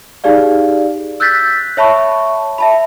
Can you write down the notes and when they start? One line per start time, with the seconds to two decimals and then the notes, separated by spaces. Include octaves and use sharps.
0.24 D#4 G4 G#4 D5 F5
1.20 E6 F#6 G6 A6 B6
1.77 C#5 E5 A5 B5 C#6
2.58 E5 A5 B5